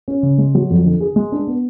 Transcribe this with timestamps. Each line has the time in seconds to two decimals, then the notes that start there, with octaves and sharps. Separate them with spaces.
0.08 C#4
0.23 C#3
0.38 G#3
0.55 F#3
0.70 F2
0.85 D3
1.01 G#4
1.16 G#3
1.32 D4
1.47 B3